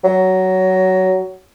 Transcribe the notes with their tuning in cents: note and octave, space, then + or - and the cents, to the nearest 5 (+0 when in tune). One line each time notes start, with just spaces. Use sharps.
F#3 +15